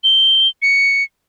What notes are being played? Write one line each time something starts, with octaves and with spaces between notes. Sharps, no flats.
G7
C#7